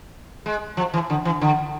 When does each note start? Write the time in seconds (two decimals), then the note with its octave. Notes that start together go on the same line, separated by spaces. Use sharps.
0.46 G#3
0.77 F3
0.94 E3
1.10 D3
1.25 E3
1.41 D3